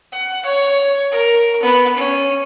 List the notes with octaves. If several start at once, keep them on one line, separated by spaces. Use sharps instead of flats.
F#5
C#5
A#4
B3
C#4